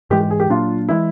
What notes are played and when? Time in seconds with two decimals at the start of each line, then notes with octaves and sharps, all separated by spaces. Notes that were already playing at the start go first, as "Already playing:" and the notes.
0.10 G#2 E3 G#3 G4
0.21 G4
0.30 G#4
0.40 G4
0.49 A#2 F#3 A#3 D4 F4
0.89 E3 G#3 E4